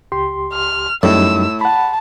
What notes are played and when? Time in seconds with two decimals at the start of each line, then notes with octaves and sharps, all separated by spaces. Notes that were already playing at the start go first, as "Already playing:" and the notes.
0.12 C#2 G4 C6
0.53 F6
1.03 F#2 A2 G3 D#4 E6
1.61 F#5 A5 B5